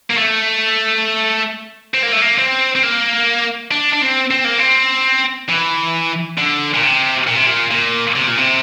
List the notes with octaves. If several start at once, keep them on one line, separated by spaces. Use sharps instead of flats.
A#3
A3
C4
A#3
A3
A#3
C4
C4
A#3
D4
D4
C4
C4
A#3
C4
E3
D3
A#2
C3
A#2
C3
A#2
A#2
C3
A#2
C3